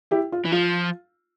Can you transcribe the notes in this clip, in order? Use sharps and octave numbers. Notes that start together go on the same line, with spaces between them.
E4 G4
F4
E3
F3 F4